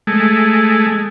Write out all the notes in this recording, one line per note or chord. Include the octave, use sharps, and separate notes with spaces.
G#3 A3